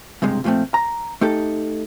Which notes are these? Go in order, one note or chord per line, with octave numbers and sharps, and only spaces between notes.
C#2 G2 C3 G#3
A#2 F3 F#3 A3 C4
A#5
A3 D#4 G4 A4